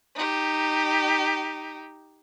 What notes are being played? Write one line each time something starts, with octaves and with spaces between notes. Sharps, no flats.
D#4 G4